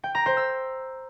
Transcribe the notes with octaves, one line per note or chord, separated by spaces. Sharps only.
G5
A#5
C5
E6